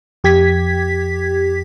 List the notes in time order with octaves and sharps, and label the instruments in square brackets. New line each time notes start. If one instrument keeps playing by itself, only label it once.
[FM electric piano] F2 G4 G#6 B6